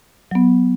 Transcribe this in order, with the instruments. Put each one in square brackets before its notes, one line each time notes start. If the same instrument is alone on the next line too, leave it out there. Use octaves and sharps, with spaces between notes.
[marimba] F#3 B3